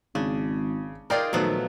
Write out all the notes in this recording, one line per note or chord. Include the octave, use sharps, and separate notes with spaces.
G#1 C#3 D4
D#4 F4 G#4 A#4 D5 G5
A#2 D#3 F3 F#3 A3 B3